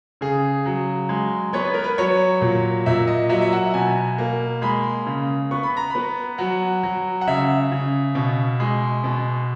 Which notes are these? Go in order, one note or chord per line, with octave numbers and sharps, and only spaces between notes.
C#3 G#4
F#3
G#3
B3 C#5
B4
A#4
B4
F#3 C#5
A#2
A#2 E5
D#5
F#3 E5
E5
F#5
B2 G#5
A#3
G#3 B5
C#3
B3 C#6
B5
A#5
B3 B5
F#3 F#5
F#3
F#5
C#3 E5
C#3
B2
G#3
B2